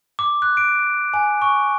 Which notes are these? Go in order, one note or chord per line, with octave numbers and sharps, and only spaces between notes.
D6
F#6
D7
G#5
C#6